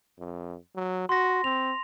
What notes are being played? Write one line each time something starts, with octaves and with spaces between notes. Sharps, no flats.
F2
F#3
F#4 C6 A#6
C4 F7